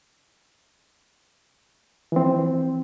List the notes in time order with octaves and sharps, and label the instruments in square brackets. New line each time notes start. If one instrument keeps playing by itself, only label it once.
[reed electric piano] E3 F3 C4